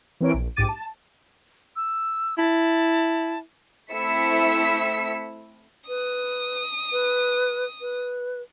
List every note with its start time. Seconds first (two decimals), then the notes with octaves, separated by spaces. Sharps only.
0.20 E3 C4 A#4 C#5 D7
0.34 A#1
0.56 A#1 G#2 G4 D6 A6 D#7
0.69 A5
1.76 E6
2.38 E4 A5
3.92 A3 C4 E4 E6 B6 C#7
5.89 B4 D#6
6.92 B4
7.81 B4